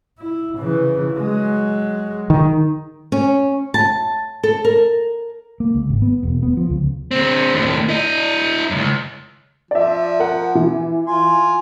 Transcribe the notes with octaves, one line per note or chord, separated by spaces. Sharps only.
E4
C#3 E3
F#3 G#3
D#3
C#4
A5
A4
A#4
A#3
C#2
G#1
B3
E1
B3
F3
C#2
D3 C4
D#2 A2
E4 D#5
C#2 F#2
F3 D5 E5
A#4 F#5
E3
F4 G#5 C6